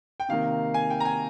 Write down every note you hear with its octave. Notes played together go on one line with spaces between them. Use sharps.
G5
C3 D#3 A#3 F5
G#5
G5
A#5
G#5